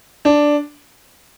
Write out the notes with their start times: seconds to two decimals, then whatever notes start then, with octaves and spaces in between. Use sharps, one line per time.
0.25 D4